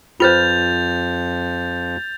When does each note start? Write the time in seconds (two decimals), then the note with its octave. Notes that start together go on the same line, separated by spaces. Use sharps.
0.20 F2 F4 B4 C5 G6 A6 F7